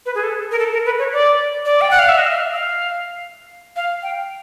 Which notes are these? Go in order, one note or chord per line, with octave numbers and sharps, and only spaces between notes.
B4
G#4
A4
A#4
A4
A#4
B4
C#5
D5
D5
G5
F#5
F5
E5
D#5
E5
F5
F5
F5
G5